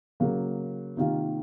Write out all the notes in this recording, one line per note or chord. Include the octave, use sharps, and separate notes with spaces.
C#3 F#3 A#3
C3 D#3 A#3 F4